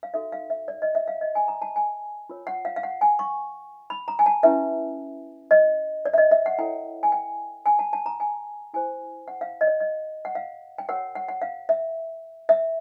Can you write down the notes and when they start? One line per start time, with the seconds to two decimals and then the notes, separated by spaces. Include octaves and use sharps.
0.03 F5
0.14 D#4 F#4 A4 E5
0.32 F5
0.50 E5
0.68 D5
0.82 D#5
0.95 E5
1.08 F5
1.21 D#5
1.35 G#5
1.48 A#5
1.62 A5
1.76 G#5
2.30 F4 A#4 C#5
2.47 F#5
2.65 F5
2.76 F5
2.83 F#5
3.01 G#5
3.19 C#6
3.90 B5
4.08 A#5
4.19 G#5
4.26 A5
4.43 C#4 E4 G4 B4 E5
5.51 D#5
6.06 D5
6.14 E5
6.18 D#5
6.31 E5
6.46 F#5
6.59 E4 A4 C#5 G5
7.03 G#5
7.12 G5
7.66 G#5
7.79 A5
7.93 A5
8.06 A#5
8.20 G#5
8.74 E4 G4 C5 G#5
9.28 F#5
9.41 F5
9.61 D#5
9.67 D5
9.80 D#5
10.25 F#5
10.35 F5
10.78 G5
10.89 F#4 A#4 C#5 F#5
11.15 F#5
11.29 F#5
11.42 F5
11.69 E5
12.49 E5